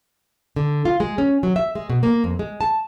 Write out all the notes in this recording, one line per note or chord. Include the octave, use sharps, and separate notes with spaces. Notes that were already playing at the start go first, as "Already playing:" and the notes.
D3
F4
G#3
C#4
F#3
E5
G#3
B2
A#3
F2
G#3
A5